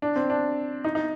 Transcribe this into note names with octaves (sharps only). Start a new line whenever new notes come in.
D4
C4
D4
D#4
D#4